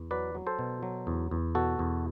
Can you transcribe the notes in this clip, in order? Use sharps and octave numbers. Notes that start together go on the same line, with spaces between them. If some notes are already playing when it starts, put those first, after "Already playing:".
Already playing: E2
F#3 B4 D5
F#3
A4 C5
B2
F#3
E2
E2
B2 F#4 A4
E2